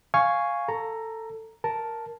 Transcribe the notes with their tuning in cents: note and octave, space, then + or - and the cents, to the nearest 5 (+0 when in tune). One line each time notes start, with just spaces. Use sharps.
F5 +0 G#5 +0 C#6 +0
A4 +15 A#5 +0
A#4 +0 A5 +0